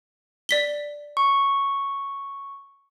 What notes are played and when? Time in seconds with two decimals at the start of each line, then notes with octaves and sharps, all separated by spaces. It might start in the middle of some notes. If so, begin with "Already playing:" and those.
0.49 D5 B6 G7
1.17 C#6